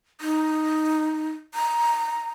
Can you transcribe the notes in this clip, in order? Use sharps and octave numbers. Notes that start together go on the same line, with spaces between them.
D#4
A#5